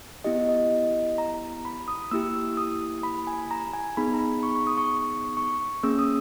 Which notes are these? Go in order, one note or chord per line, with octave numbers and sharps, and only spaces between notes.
B3 E4 G4 D#5
D#5
A#5
B5
D#6
A#3 E4 G4 E6
D#6
B5
G#5
A#5
G#5
B3 D#4 G#4 B5
A#5
B5
C#6
C#6
D#6
C#6
C#6
A#3 C#4 G#4 E6
D#6